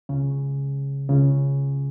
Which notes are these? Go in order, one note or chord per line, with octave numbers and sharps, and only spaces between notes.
C#2 C#3
C#2 C#3